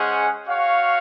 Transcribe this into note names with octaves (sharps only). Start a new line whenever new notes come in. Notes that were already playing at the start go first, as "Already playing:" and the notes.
Already playing: G#3 C#4 G#4 C5 F#5
F#4 C#5 F5